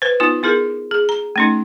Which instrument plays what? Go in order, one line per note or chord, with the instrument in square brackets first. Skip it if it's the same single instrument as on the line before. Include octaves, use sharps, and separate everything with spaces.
[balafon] B4 C5
B3 D#4 F4
B3 E4 G#4 A#4
G#4
A#5
A3 C#4 D#4